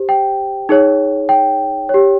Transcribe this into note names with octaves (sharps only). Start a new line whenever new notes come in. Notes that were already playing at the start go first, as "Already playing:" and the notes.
Already playing: G4 C5
G5
D#4 G#4 C#5
G5
G4 C#5